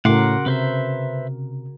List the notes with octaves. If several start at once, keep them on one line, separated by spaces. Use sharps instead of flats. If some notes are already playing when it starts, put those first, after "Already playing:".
A2 C#3 F#4 A#4 F#5 C6 D6
C3 B4 C5 E5